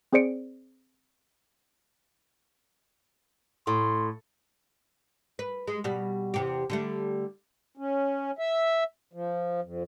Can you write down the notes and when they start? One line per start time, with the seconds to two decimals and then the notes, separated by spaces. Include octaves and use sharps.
0.13 C4 G#4 C5 D5 C#7 D7
3.67 A2 C6
5.39 B4
5.68 G#3
5.84 B2 G3
6.34 E2 C3 G4
6.70 D3 G3 A3
7.77 C#4
8.39 E5
9.13 F3
9.62 F2